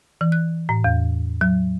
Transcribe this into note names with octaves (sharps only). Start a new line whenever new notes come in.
E3
F#6
A2
E2
F#3